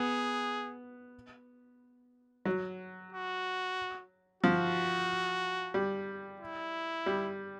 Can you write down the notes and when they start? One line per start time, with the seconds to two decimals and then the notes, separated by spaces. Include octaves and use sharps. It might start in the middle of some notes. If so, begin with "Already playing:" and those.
Already playing: B3 G#4
2.45 F#3
3.12 F#4
4.43 F3 F#4
5.74 G3
6.40 E4
7.06 G3